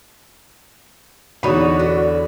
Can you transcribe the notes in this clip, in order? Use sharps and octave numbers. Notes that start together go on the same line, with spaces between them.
E2 D3 D#4 F#4 C#5 B5
D3